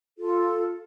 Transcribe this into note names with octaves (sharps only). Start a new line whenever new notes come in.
F4 A4